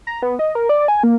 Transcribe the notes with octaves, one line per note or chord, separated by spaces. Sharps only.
A#5
B3
D#5
A#4
D5
G#5
A#3